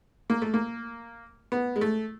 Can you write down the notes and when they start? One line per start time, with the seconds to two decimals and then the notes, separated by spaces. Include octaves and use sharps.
0.30 A#3
0.42 A3
0.54 A#3
1.52 B3
1.76 G#3
1.81 A3